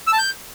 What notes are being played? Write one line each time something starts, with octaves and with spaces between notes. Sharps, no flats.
E6
A5
G6